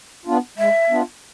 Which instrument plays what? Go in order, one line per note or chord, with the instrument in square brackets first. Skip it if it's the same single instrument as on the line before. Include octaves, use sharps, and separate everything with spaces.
[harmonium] B3 D4 F4
[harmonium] G#3 [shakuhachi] E5
[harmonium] B3 D4 F4